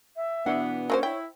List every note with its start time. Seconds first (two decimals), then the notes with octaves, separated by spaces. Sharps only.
0.16 E5
0.46 B2 E3 B3 D4 F#5
0.90 F#3 A#3 C#4 F4 C5 C#5
1.03 E4 G5